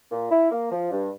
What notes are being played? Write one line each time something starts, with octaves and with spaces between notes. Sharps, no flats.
A#2
E4
A#3
F3
G2